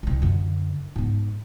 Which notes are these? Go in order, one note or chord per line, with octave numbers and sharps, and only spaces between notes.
C2 C3
F#2 D3
G#2 B3